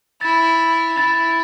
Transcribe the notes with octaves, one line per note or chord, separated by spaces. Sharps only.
E4 A6
A6
E4 A6